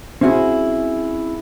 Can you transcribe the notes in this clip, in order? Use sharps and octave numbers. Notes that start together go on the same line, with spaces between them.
C4 C#4 E4 F#4 G#4